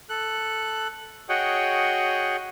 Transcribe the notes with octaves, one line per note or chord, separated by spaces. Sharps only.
A4 F#6
F#4 G#4 C#5 D#5 F#5 G5